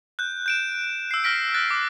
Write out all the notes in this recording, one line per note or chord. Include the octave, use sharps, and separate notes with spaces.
F#6 G6
G6 D7 E7
E6 C7
F6 A#6 B6 D7
F#6 A6 A#6
D6